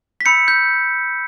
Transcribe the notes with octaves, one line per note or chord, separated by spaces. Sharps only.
B6
B5 E6 G6 C#7
G6